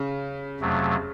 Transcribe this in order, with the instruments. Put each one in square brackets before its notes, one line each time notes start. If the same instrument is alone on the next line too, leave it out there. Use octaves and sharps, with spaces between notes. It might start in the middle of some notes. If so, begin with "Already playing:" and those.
Already playing: [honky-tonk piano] C#3
[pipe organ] F2 C3 F#3 A3